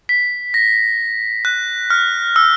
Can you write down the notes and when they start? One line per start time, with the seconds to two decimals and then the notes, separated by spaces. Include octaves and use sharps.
0.09 B6
0.54 A#6
1.45 F#6
1.90 F6
2.36 E6